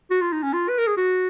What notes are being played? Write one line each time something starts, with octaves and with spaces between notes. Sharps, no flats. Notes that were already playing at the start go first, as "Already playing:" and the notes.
F#4
F4
D#4
C#4
F4
B4
A#4
G#4
F#4